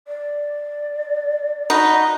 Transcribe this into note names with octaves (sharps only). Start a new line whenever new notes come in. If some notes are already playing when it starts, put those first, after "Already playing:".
D5
D#4 F#4 B4 D#5